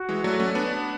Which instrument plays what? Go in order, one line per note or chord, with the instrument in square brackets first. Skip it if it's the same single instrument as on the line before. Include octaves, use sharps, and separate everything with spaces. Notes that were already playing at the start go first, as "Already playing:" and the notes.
Already playing: [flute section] F#4
[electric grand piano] E3 G#3
[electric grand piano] F#3 A3 [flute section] D5
[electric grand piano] A3 C#4
[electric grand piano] B3 D4 [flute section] A5